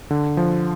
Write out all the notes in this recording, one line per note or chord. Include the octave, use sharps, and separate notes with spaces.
D3
F3